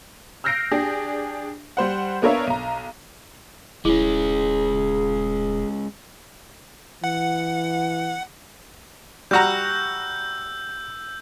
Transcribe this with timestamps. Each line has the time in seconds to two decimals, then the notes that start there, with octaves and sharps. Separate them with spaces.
0.44 E6 F6 G6 A#6 C7 D7
0.72 D4 G4 G#4
1.77 G3 C5 F#5
2.22 B3 D4 A#4 C#5 E5 F5
2.47 B1 A#5
3.85 D#1 G#3 C#4 E4 G#4
7.04 E3 F#5
9.31 G3 F#4 A#5 E6 G6